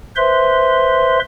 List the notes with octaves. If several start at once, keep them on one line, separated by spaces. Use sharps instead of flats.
B4 C5 E5 C6